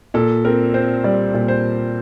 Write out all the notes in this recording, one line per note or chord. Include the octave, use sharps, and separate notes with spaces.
A#2 A4
C4 A#4
C4 C5
G3 D5
A#2
C5